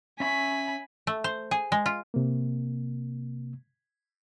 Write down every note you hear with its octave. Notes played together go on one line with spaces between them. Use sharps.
C#4 E5 G#5 B5 C#6
A3
C5
G#4
G#3
F4
C3 A#3